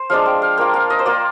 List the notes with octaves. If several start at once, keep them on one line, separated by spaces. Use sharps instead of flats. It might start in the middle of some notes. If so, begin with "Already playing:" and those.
Already playing: C5
F3 G#3 D4 F5
G5
F5
A#3 F4 G5
F5
D#5
C5
A#3 F4 D5